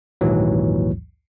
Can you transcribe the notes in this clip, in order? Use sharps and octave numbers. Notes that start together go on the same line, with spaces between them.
A#1 D#2 G#2 E3 F#3